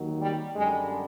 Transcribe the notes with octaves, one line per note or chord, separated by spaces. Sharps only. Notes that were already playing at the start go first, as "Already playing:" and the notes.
Already playing: D#2 D#3 F#3
G3
F#2 D3 G3 G#3